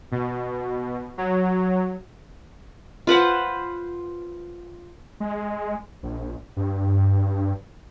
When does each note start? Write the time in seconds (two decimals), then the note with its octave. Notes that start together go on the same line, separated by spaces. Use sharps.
0.12 B2
1.18 F#3
3.07 F4 B4 C5 F#5
5.20 G#3
6.03 A#1
6.57 G2